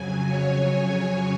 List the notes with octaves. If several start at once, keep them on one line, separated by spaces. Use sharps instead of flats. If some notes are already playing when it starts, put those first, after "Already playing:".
Already playing: F2 C#3 F#3 G#5
C#5